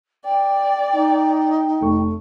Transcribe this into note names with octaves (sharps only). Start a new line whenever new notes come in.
D5 G5
D#4
F1 A3 C#6